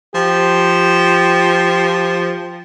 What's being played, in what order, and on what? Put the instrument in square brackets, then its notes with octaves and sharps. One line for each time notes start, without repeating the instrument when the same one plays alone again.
[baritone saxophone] F3 [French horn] G4